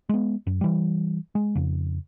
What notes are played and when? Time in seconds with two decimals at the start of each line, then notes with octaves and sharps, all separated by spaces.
0.09 G#3 B3
0.47 F#2
0.61 E3 G3
1.35 G#3
1.55 F2 C#3